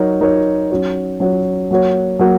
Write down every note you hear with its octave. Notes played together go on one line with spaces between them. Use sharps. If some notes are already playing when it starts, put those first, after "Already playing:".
Already playing: F#3 D#4 A#4 C#5
F#3 D#4 A#4 C#5
F#3 C#4 F#4 C#5
F#3 C#4 F#4 C#5
F#3 A#3 F#4 C#5
F#3 A#3 F#4 C#5